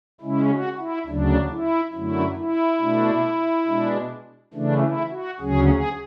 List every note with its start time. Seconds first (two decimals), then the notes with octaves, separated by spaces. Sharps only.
0.21 C#3 G#3 C#4 E4
0.49 F#4
0.78 E4
1.07 D2 C#3 F#3 D4
1.50 E4
1.93 F#2 D3 F#3 A3 E4
2.37 E4
2.80 B2 A3 D4
3.67 B2 G#3 D4
4.53 C#3 E3 A3 D4
4.82 E4
5.11 F#4
5.40 D2 C#3 F#3 C#4 G#4
5.69 G#4